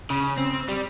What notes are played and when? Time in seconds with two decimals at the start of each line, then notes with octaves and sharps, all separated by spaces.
0.10 C#3
0.37 C4
0.68 G3